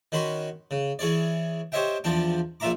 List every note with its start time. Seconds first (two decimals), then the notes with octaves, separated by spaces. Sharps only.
0.12 D#3 C#4 F#4 B5 C6
0.71 C#3
0.99 E3 G#4 C#5 D5
1.72 G4 C5 C#5 D#5 E5 G5
2.04 E2 F3 D4 G5
2.60 A#1 A#2 F4 E5 A#5 D6